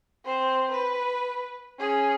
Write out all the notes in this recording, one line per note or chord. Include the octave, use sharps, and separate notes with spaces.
C4 C5
B4
C#4 G#4